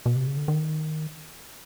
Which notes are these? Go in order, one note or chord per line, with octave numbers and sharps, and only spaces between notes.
B2
C3
C#3
D3
D#3